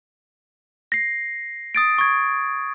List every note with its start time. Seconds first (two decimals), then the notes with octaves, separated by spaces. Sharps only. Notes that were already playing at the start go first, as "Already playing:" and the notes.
0.92 A#6 C7
1.75 D#6 A6 D7
1.98 C#6 G#6